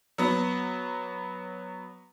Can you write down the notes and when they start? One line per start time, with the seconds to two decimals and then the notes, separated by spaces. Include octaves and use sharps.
0.18 F#3 B3